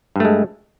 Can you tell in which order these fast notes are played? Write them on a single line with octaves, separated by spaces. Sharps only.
G2 A3 G#3